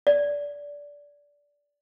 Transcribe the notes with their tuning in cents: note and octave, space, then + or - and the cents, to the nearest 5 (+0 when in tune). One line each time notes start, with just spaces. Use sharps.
D5 -20